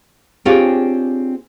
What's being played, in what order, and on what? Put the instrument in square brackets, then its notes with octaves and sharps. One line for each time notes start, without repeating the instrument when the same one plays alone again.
[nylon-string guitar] C4 D4 F4 G4 G#4 C#5